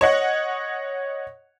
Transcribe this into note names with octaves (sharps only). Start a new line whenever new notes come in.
C#5 D#5 F#5